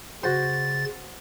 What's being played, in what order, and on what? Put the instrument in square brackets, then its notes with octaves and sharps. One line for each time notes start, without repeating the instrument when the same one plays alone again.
[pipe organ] C#3 A6 [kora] F#4 C5